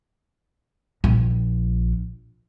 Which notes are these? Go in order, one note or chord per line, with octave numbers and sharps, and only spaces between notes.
A#1